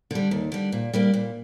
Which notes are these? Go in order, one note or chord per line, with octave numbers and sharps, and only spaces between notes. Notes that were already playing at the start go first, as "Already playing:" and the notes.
D3 G3
D#2
D3 G3
A#2
G3 A#3 D4
A#2